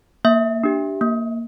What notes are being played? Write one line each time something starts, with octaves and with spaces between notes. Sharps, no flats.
A#3 E5
D4 G4
A#3